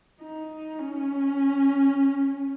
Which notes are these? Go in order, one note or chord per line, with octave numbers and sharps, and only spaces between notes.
D#4
C#4